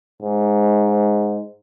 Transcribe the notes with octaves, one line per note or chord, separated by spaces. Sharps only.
G#2